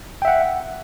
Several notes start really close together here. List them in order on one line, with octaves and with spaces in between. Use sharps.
G5 E5 F#5